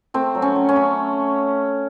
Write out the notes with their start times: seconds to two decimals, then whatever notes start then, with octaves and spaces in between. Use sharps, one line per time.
0.14 A3 C4
0.35 F#3
0.42 C#4
0.55 F#3
0.69 C#4
0.76 A3